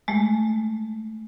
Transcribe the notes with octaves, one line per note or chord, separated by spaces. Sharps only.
G#3 A3